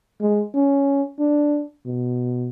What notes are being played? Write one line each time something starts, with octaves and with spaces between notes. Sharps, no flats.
G#3
C#4
D4
B2